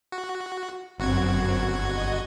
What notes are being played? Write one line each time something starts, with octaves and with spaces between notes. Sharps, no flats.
F#4
G1 F#2 C4 F#4 G#6
D#5